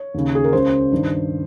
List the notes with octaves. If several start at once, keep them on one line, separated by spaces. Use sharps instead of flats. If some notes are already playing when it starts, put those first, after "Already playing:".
Already playing: C#5
D#2 C#3
G#4
A#4
C#2 C#3 C5
G2 D#3